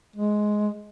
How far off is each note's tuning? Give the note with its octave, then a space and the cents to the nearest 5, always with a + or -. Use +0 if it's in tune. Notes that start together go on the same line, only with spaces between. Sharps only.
G#3 +10